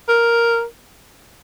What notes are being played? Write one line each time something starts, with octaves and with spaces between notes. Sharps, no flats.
A#4